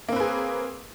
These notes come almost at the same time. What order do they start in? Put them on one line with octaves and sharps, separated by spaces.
A#3 C4 B4 G#4